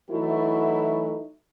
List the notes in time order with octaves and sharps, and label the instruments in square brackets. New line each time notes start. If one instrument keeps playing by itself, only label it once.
[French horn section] E3 F#3 A3 D#4 E4 F#4